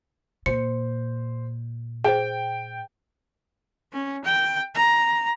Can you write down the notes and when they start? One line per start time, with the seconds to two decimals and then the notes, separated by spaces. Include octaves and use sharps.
0.46 A#2 C5 C#7
2.04 G#4 C5 G5
3.93 C#4
4.25 G5
4.74 A#5